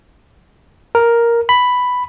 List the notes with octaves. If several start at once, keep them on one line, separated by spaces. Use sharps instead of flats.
A#4
B5